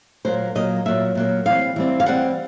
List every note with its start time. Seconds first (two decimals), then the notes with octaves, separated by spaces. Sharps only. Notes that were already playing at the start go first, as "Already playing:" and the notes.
0.25 A#2 F#3 A#3 C5
0.55 A#2 F#3 A#3 D#5
0.86 A#2 F#3 A#3 E5
1.15 A#2 F#3 A#3
1.45 E3 G3 C4 F5
1.76 E3 G3 C4
2.00 F5
2.06 E3 G3 C4 F#5